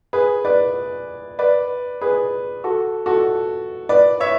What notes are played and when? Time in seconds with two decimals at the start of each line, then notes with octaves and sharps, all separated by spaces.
0.13 G#4 B4
0.45 B4 D5
1.39 B4 D5
2.01 G#4 B4
2.64 F#4 A4
3.06 F#4 A4
3.89 B4 D5
4.20 C#5 E5